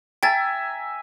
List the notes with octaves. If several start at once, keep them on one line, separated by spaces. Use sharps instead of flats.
E5 G5 G#5 A#5 A6